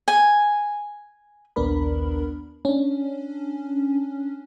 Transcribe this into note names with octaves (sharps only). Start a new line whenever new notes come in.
G#5
A#1 D#2 B3 D4 A#4 B5
C#4 D4